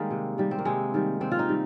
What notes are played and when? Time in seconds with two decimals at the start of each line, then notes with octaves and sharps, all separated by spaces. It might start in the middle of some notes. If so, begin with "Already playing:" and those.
Already playing: D#3 G3 G#3 A#3
0.11 C3
0.38 D#3 G3
0.51 C4
0.59 A#3
0.65 C3 G#3
0.94 D#3 G3
1.21 C3 C4
1.32 F4
1.39 D#4
1.49 D#3 G3